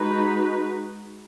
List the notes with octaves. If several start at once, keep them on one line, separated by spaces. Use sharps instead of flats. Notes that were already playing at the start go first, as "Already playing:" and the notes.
Already playing: G#3 D#4 F#4 B4